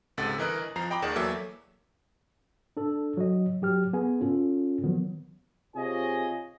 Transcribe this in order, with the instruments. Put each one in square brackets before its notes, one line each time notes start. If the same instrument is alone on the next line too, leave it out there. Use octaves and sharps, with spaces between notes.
[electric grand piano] C#2 G#2 C3 A4 F#5 A6
G1 E3 A#4 D#5 D#6 F#6
F2 F3 A#5 C7
D#5 G5 A#5 B5 D6
D#2 D#3 G#4 D5 F#5 E7
E2 F#3 A#3 A4 E5 D6
[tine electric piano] D4 A4
F#3 D#5
F#3 G4 F6
B3 G#4 G#5
C#4 F4 A4
D#3 F3 F#3 B3
[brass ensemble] C3 F4 G#4 C#5 D#5 G#5